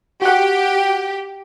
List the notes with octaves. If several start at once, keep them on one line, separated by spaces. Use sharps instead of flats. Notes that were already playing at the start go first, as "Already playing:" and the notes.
F#4 G4 F#5